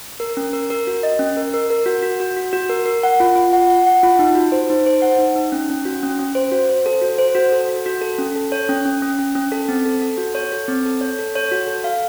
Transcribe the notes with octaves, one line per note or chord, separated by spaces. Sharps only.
A#4
C#4
A#4
A#4
F#4
D#5
C#4
A#4
A#4
A#4
F#4
F#4
F#4
F#4
F#4
A#4
A#4
F#5
F4
F4
F#5
F#5
F#5
F4
D#4
F#4
C5
D#4
C5
F#5
D#4
D#4
C#4
C#4
F#4
C#4
C#4
C5
F#4
C5
A4
F#4
C5
F#4
A4
F#4
F#4
A4
C#4
A4
C#5
C#4
C#4
C#4
C#4
C#4
A4
C4
A4
A4
F#4
C#5
A4
C4
A4
C#5
A4
C#5
F#4
A4
F5